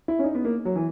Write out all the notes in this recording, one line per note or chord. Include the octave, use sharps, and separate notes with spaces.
E4
C#4
D#4
B3
A#3
F#3
E3